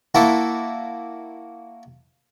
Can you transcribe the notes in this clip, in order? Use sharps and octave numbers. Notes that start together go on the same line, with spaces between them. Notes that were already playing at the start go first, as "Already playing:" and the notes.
A#3 E4 F#4 A4 A#4